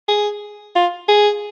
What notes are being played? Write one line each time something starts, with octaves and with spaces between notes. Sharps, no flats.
G#4
F4
G#4